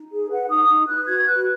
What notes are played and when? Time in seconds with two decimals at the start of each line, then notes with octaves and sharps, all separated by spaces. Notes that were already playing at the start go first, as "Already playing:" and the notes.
Already playing: D#4
0.12 G#4
0.30 B4 F#5
0.49 D#4 D#6
0.69 D#4
0.87 B4 F#6
1.07 F#4 G#6
1.26 B4 F#6